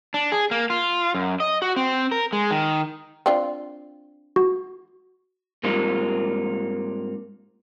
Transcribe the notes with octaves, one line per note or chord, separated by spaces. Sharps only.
D4
G#4
A#3
F4
F#2
D#5
F#4
C4
A#4
G#3
D#3
C4 D4 F4
F#4
G#2 G3 A#3 C4 D#4 F4